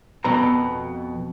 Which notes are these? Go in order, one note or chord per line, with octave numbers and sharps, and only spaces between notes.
F2 B2 A#5